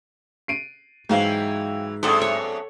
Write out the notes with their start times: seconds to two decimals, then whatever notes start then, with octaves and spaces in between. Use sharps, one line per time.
0.48 C7 D7 D#7
1.09 G#2 E3 F#3 F#4 C5 F5 G5
2.03 A2 F#3 B3 C4 D4 G#4 A4 C5
2.22 C#5